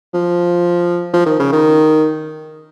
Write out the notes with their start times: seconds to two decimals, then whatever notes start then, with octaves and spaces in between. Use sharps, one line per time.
0.14 F3
1.13 F3
1.26 D#3
1.40 C#3
1.52 D#3